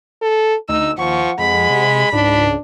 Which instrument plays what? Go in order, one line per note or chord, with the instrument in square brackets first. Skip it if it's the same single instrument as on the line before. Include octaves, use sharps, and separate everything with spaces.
[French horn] A4
[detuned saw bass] D2 [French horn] D#4 [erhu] E6
[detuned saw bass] D#2 [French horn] F3 [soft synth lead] F#5 [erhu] C#6
[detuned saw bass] F2 [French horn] G#3 [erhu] B5
[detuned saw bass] C3
[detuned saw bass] C#2 [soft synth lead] G#2 [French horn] D4